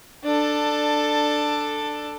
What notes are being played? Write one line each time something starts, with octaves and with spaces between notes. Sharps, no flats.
D4 A4